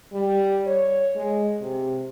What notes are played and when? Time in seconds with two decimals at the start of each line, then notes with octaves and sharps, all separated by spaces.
0.12 G3
0.67 C#5
1.16 G#3
1.62 C3